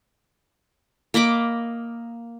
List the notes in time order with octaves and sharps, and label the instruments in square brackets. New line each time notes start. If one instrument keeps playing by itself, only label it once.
[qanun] A#3 D#5 B5 D6